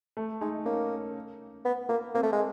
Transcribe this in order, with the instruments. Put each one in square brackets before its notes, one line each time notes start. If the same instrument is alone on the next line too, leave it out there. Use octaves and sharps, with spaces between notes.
[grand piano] A3
[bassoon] G#3 [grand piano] D#4
[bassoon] A#3 [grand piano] C#4
[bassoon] B3
A#3
[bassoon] A#3 [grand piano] C4
[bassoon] A3
G#3